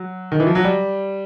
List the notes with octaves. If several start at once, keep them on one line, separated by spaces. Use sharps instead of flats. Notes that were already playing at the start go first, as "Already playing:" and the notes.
Already playing: F#3
D#3
E3
F3
F#3
G3